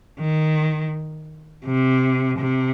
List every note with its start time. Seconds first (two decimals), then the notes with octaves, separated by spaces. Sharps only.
0.19 D#3
1.65 C3
2.38 C3